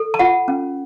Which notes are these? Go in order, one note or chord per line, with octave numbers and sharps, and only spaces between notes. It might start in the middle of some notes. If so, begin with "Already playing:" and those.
Already playing: A4
A5
F4 F#5
C#4